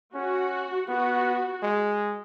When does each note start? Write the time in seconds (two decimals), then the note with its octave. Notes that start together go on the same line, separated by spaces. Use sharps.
0.14 C#4 F#4
0.88 B3 F#4
1.63 G#3